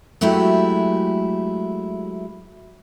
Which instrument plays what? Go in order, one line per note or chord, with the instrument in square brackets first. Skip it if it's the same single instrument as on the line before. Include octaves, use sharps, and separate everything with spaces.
[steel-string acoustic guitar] F#3 G#3 A3 E4 F#4 G4